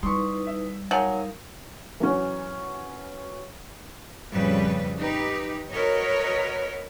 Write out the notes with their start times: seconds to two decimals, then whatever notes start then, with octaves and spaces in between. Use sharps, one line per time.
0.03 G3 D#4 E4 B4 C6 C#6
0.47 E5
0.91 F#3 D#4 A#4 F5 G#5 G6
2.00 E3 F#3 C#4
4.31 F2 A2 C#3 G3 B4
4.98 D#4 G4 B4
5.71 F#4 A#4 B4 C#5 D#5